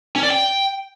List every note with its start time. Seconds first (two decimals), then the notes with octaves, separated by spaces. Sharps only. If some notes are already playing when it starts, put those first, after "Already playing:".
0.16 C#4
0.23 D5
0.30 G5